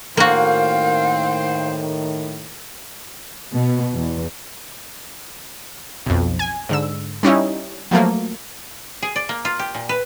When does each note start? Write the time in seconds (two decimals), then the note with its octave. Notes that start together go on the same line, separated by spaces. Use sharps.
0.17 A2 D#3 A#3 F#4 C5 F5 G5
3.53 B2
3.94 E2
6.06 B1 F2
6.39 G#5
6.69 G#2 D3 E6
7.23 G3 C#4 D#4 E4
7.91 F3 F#3 A3 A#3
9.02 G#4
9.16 D5
9.29 A#3
9.45 F4
9.59 G4
9.75 A#2
9.89 B4